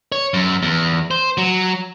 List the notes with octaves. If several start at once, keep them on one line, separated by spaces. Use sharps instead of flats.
C#5
F#2
E2
C5
F#3